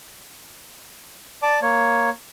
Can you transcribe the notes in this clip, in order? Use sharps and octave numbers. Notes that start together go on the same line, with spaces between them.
D5 A5 D6
A#3 C#5